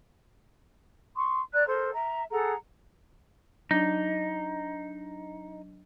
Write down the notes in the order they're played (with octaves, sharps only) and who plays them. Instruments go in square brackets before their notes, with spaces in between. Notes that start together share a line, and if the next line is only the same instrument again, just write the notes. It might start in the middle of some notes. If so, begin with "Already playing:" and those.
[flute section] C6 C#6 D#6
D5 A#5 F#6
A4 A#4 C5
E5 A#5
G#4 A4 F#5 A#5
[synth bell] F#3 D4 D#5 [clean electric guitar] D#4